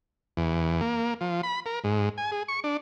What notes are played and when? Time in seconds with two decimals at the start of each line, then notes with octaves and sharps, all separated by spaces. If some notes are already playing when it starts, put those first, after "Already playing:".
0.37 E2
0.81 A#3
1.21 F3
1.43 B5
1.66 A#4
1.84 G#2
2.18 G#5
2.32 G#4
2.48 C#6
2.64 D4